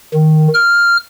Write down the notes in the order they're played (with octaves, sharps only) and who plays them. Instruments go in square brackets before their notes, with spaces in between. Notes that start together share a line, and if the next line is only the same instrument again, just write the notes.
[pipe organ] D#3
F6